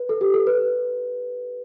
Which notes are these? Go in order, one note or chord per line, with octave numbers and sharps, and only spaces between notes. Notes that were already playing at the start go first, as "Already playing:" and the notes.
Already playing: B4
A4
G4
A4
B4